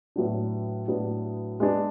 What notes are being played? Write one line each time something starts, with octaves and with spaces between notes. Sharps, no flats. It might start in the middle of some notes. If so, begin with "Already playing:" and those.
A2 F#3 B3 D4
A2 F#3 B3 D4
G#3 B3 D4 G#4